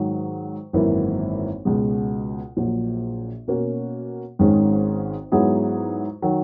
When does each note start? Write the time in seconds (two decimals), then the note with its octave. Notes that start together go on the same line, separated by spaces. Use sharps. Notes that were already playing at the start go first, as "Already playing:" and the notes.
Already playing: G#2 D#3 F#3
0.73 G#1 F#2 E3 A#3 E4
1.65 C#2 B2 G#3
2.57 A#1 A#2 F#3
3.47 B2 A#3 C#4 F#4
4.39 G#1 G#2 D#3 G#3 C#4
5.32 G#2 F#3 B3 E4 G#4
6.22 D#3 F#3